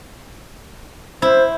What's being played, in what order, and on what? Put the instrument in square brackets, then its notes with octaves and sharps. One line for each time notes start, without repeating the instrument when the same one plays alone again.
[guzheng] E4 [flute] C5